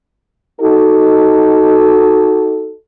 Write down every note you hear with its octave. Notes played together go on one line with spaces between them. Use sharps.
D#4 F#4 A4